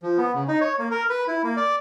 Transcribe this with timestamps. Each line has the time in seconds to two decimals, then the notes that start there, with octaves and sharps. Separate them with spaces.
0.03 F3
0.18 B3
0.34 C#3
0.48 D#4
0.61 C#5
0.79 A#3
0.91 A#4
1.09 B4
1.28 E4
1.44 A#3
1.57 D5